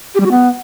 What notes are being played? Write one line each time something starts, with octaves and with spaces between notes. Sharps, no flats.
G4
G3
F#4
B3